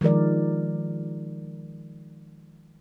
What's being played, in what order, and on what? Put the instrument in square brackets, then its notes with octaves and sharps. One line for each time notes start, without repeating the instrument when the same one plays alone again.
[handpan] D#3 F3 G#3 A#4 D5